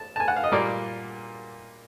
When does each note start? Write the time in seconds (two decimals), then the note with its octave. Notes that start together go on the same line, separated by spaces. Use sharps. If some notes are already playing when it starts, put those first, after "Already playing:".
Already playing: A5
0.16 A5
0.20 G#5
0.28 F#5
0.36 F5
0.44 D#5
0.52 A#2 G3 A#3 D5